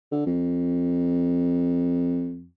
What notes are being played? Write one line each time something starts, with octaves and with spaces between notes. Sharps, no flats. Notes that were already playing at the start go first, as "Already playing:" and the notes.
D3
F2